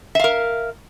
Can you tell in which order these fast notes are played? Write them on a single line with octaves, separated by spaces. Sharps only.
E5 F5 A#4